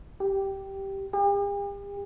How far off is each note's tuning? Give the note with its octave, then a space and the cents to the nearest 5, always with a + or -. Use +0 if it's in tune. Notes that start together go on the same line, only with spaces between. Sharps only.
G4 -5
G4 +45